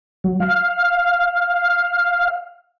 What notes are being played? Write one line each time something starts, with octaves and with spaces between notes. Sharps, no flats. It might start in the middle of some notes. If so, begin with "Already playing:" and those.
F#3
F5